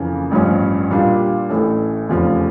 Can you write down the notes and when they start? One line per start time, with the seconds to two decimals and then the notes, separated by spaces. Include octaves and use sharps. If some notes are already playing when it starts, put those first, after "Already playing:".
Already playing: F2 C#3 E3 A#3
0.31 A1 G2 F3 C#4
0.90 A#2 G3 D4 F4
1.49 A1 A2 E3 A3 C#4
2.09 F1 E2 C#3 F3